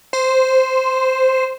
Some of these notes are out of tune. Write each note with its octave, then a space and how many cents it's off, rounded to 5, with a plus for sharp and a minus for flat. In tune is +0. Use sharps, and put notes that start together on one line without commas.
C5 -5